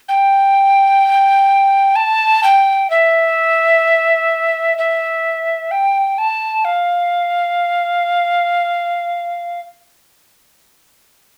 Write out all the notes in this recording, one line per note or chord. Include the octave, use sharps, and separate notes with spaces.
G5
A5
G5
E5
E5
G5
A5
F5